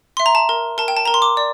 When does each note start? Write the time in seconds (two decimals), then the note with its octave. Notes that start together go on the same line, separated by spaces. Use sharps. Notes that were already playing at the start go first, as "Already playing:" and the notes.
0.17 E5 C6
0.26 A#5
0.35 A5
0.49 A#4
0.78 A#4 A5
0.88 G5
0.97 A5
1.05 A#4 A#5
1.14 C6
1.22 D6
1.37 D5